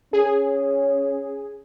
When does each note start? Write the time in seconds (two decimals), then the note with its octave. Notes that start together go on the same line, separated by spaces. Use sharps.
0.13 C#4 G#4